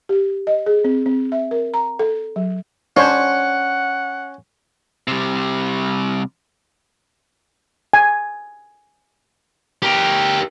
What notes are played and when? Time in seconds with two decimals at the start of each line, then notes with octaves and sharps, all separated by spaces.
0.09 G4
0.47 D#5
0.66 G#4
0.84 C4
1.06 C4
1.32 E5
1.51 A#4
1.74 A#5
1.99 A4
2.36 F#3
2.97 C#4 D4 C5 C#5 F#5
5.08 C3 G3
7.93 G#5
9.82 G4 A#4